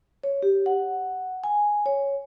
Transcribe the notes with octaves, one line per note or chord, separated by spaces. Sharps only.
C#5
G4
F#5
G#5
C#5